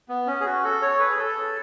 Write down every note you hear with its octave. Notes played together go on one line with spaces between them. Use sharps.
B3
C#4
G#4
F#4
A4
C#5
B4
G#4
A4